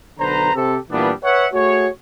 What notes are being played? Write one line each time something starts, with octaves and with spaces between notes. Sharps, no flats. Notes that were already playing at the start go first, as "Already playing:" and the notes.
B1 D3 B4 C5 A#5
C3 C4 G4 A4
A#2 E3 G3 B3 D4
B4 C#5 E5 F#5
A3 F#4 G#4 C#5